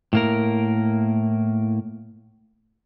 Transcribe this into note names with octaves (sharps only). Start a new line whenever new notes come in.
A2 A#3 A#4